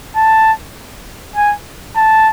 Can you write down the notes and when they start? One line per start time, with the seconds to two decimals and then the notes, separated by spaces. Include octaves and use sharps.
0.16 A5
1.36 G#5
1.97 A5